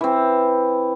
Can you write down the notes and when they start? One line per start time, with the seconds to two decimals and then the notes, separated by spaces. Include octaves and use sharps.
0.01 E3 C4